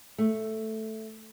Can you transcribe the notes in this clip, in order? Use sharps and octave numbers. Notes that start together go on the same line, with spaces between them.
A3